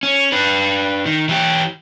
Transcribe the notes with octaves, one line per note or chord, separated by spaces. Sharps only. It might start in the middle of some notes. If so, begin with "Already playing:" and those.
C#4
D4 B4
D#3
E3 G4